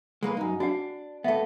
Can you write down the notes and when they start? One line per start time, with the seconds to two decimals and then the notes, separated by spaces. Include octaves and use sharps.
0.23 G#3 A#3 B4
0.37 F#2 D#4
0.60 D4 F#4 F#5
1.24 A3 B3 E5